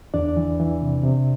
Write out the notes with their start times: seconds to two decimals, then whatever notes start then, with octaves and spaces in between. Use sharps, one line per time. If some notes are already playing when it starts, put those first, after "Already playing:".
0.14 E2 D4 D5
0.37 E3
0.60 E3
0.82 C3
1.03 C3